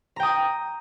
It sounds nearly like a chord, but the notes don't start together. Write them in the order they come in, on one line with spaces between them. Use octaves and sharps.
A#5 G5 D#6